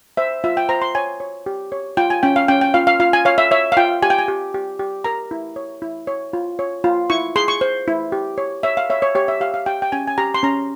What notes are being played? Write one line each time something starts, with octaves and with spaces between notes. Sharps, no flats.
C5 E5
F4 E5
G5
C5 A#5
C6
C#5 G#5
C#5
G4
C#5
F4 G5
G#5
C#4 G5
F5
C#4 G5
G5
F4 F5
F5
F4 F5
G#5
C#5 F5
E5
C#5 E5
F5
F4 G5
G4 G#5
G5
G#5
G4
G4
G4
A#4 A#5
E4
C#5
E4
C#5
F4
C#5
F4
E4 C#6
G#4 C6
C#6
C5
E4
G4
C#5
C#5 E5
F5
C#5 E5
C#5
G4 C#5
E5
G4 F5
F5
G4 G5
G5
C#4 G#5
G#5
G4 A#5
C6
C#4 A#5